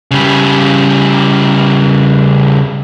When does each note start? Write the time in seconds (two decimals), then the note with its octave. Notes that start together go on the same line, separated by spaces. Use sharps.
0.11 C#3 G3